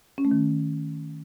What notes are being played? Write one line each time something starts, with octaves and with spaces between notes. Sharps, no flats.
C#4
A3
D#3